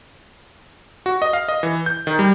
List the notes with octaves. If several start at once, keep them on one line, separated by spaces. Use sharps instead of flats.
F#4
D#5
F5
D#5
E3
G6
D#3
G3